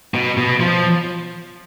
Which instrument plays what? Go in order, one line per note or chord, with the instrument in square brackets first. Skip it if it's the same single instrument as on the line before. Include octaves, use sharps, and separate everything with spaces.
[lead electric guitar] B2
B2
F3